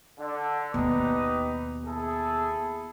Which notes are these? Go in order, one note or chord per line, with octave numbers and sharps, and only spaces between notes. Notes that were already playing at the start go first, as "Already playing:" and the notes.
D3
D#2 B2 D#4 G4 B4
E4 G#4 A4